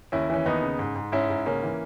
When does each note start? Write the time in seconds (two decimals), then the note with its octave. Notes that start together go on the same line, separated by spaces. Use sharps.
0.12 D#2 C#4 E4
0.30 E3 C#4
0.46 D#2 B3 D#4
0.62 C#3
0.79 G#2
0.96 G#2
1.12 G#2 C#4 E4
1.30 G#2
1.46 C#3 A#3 C#4
1.63 E3